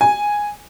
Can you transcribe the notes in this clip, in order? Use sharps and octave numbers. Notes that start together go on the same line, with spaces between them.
G#5